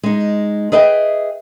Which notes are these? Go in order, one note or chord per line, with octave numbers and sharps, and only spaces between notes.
G#3 D#4
G#4 B4 D#5 E5 G5